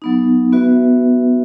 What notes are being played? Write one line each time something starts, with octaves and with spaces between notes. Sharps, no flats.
F#3 B3 D#4
B3 F#4 B4 E5